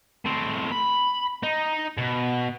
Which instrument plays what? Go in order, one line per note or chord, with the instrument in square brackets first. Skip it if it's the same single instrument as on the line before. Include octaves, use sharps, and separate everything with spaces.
[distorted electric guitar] A2 C4
B5
D#4
B2